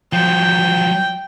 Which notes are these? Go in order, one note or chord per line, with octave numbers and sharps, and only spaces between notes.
F3 F#3 G5